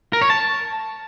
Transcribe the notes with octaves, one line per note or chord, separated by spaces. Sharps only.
A#4
C#5
A5